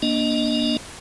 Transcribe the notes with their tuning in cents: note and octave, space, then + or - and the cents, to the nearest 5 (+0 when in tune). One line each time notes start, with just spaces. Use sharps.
A#3 +25 D4 +0 D#5 +0